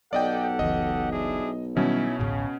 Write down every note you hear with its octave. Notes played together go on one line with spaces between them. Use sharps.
B1 G4 A4 D5 D#5 F#5 G5
F#1 C#2 E3 D#5
D4 E4 G#4
B2 D#3 F#3 G3 C#4 D#4 E4
A1 D2 A2 C#3